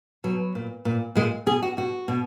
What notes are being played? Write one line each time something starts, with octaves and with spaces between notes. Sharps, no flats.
B2 F#3
A#2
A#2
A#2 G#3
B2 G#4
F#4
B2 F#4
B2